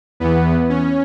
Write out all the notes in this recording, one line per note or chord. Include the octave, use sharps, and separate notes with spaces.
E2 E3 B3
C#4